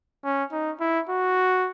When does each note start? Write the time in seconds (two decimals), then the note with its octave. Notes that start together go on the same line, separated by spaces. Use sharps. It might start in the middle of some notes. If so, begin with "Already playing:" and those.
0.24 C#4
0.52 D#4
0.80 E4
1.09 F#4